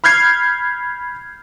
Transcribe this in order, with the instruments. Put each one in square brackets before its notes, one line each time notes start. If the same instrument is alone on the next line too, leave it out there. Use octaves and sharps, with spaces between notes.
[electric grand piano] B5 F6 G6 G#6 C7